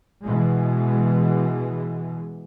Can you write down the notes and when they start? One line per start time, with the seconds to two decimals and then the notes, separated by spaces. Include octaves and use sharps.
0.23 B2 E3 G#3